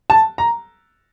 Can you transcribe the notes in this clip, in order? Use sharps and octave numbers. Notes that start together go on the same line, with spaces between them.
A5
A#5